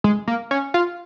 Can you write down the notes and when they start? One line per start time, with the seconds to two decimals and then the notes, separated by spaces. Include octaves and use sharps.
0.04 G#3
0.28 A#3
0.51 C#4
0.74 F4